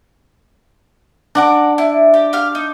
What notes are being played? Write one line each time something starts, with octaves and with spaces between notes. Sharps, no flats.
D4 A#4 F#5 D6
E4
G4
G4 F5 F6
D#4